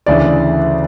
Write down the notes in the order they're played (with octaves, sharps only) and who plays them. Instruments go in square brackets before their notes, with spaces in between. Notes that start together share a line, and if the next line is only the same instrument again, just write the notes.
[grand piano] D2 C#3 E3 D5